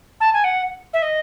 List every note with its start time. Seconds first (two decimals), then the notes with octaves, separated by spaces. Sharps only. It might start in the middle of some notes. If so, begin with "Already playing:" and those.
0.20 A5
0.33 G#5
0.44 F#5
0.93 E5
1.02 D#5